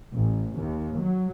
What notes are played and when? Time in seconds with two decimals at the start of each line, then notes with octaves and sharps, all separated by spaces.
0.12 A1
0.56 D#2
1.00 F#3